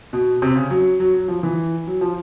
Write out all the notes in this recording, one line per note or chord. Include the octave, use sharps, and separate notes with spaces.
B2
C3
C#3
F#3
F#3
F#3
F3
E3
F#3
F3